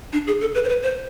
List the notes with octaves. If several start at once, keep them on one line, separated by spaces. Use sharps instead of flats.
D4
G#4
A4
B4
C5
B4
C5